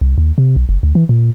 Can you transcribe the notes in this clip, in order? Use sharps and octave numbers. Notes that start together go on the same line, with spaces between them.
C2
D#2
C3
B1
F#1
D2
E3
A#2